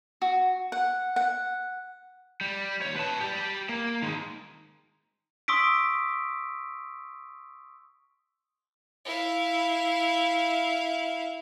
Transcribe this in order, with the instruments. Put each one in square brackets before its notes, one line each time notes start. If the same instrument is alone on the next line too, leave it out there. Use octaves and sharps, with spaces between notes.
[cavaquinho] F#4
F#5
F#5
[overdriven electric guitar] G3
D#2 C#5
B4 A5
G4 D5
A#3
D#3 G#3
[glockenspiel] C6 C#6 D#6 E6 B6 D7
[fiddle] E4 F5